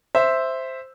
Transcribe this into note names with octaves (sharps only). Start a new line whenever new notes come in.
C5 E5